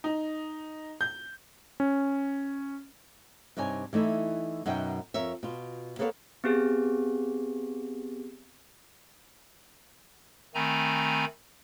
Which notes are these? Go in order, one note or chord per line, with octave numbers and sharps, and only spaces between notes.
D#4
G6
C#4
G2 C3 D#4 C#5 G#5
E3 A3 D#4 E4
F#2 B2 D#4 E5 G5
F2 A#4 C#5 E5
B2 F4
A#3 B3 A4 C#5 D#5 F5
B3 C4 G4 G#4
D#3 A3 C4 G#5 A#5 B5